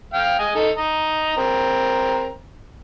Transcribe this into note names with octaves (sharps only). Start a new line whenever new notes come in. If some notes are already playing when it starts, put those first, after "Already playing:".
F5 G5
D#5 G#5
D#4 A4
D#5 A#5
C4 A#4